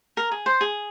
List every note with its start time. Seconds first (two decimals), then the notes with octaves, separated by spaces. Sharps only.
0.17 A#4
0.31 G#4
0.46 C5
0.61 G#4